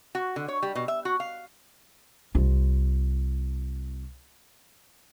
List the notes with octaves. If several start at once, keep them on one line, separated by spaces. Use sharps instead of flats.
F#4
D3
C#5
G3
B2
E5
F#4
F5
C2 F4